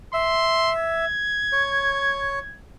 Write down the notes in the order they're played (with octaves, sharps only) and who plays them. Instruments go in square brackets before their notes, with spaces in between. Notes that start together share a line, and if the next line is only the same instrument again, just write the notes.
[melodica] E5 [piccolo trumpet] C6
[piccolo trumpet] G#6
[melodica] C#5